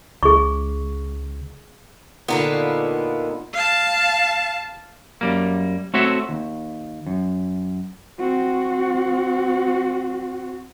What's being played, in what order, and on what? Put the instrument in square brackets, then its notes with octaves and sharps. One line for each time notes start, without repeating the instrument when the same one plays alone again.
[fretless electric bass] C#2 [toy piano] G#4 C#6
[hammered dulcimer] A#2 D#3 F4 [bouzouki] D3 A#3 B3
[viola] F5 A5
[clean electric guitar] F#2 G3 A#3
A3 C4 F#4 C#5 E5
D#2
F#2
[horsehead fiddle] C4 F#4